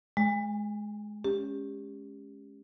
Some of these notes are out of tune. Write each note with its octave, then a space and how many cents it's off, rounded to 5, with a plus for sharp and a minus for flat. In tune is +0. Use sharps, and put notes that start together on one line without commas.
G#3 +20 G#5 -40
C#4 +0 G4 +25